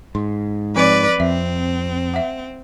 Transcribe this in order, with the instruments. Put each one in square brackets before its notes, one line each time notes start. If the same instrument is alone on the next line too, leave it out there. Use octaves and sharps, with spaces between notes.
[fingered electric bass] G#2 [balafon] C6
[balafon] F3 C4 [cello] B4 D5
[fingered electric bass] F2 [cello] C4 [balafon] E5
[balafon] E5 F#5